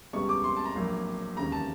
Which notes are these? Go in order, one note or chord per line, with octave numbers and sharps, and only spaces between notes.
C#2 B2 G3 B3 C#6
D6
C6
A5
A#5
A#1 A2 F#3 A#3
E1 D#2 C#3 A#5
A5